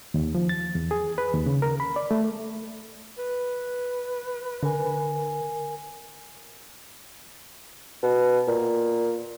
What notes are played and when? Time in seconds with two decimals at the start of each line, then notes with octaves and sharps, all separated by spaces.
0.14 D#2
0.35 F3
0.49 A6
0.75 E2
0.91 G#4
1.18 B4
1.34 D#2
1.46 C#3
1.62 A#4
1.80 B5
1.96 D5
2.11 A3
3.18 B4
4.63 D3 A#4 G#5
8.03 B2
8.48 A#2